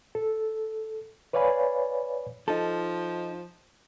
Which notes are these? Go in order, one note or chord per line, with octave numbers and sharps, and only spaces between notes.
A4
B4 C#5 D5 F5 G#5 B5
F3 D#4 A4